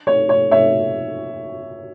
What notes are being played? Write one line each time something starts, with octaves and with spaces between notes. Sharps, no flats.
C#5
C#5
C#5 E5